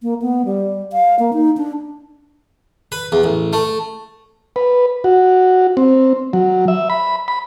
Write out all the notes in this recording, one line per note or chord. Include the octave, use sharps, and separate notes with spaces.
A#3
B3
G3
F5
A#3
D#4
D4
B4
E2
A1
A3
B4
F#4
C4
F#3
E5
B5
B5